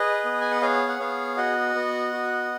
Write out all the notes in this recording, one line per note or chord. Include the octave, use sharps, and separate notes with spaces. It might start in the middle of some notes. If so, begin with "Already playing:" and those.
Already playing: G#4 B4 D#5
B3
G#5
F#5
G#4 C#5 F5
F#5
B3 C#5 F5
F#4 D#5 F#5
B3
F#4